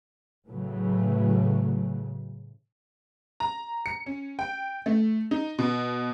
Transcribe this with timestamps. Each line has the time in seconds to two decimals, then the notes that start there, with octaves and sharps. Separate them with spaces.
0.47 A2 C#3 E3 F#3 A3
3.40 A#5
3.86 C#7
4.06 C#4
4.39 G5
4.86 A3
5.31 D#4
5.59 B2